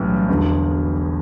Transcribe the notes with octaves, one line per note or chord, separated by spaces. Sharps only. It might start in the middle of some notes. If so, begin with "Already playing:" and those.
Already playing: B1 A2 E3 G3 C#4
E1 E2 D3